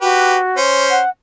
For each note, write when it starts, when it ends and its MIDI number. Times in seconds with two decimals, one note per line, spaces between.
0.02 0.56 66
0.02 0.37 67
0.02 0.37 71
0.57 1.00 61
0.57 1.00 72
0.90 1.09 78